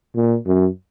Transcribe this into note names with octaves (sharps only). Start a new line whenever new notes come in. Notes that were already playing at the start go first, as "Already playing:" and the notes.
A#2
F#2